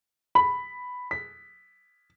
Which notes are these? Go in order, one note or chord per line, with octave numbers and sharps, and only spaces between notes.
B5
B6